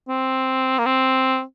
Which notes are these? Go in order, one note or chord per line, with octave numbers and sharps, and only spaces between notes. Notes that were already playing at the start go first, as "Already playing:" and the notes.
C4
A#3
C4